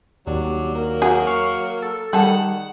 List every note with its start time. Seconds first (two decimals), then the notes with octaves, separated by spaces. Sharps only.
0.27 D#2 F#3 G3 D4
0.75 F#3 A#3 A#4
1.02 F#4 G#4
1.27 F5 C#6
1.82 A4
2.13 D#3 G3 G#4 A4 F#5